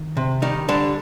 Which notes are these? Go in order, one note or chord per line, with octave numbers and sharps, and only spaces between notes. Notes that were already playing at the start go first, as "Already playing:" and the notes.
Already playing: D#3
C3
D#3 G3 D#4
D3 G3 D4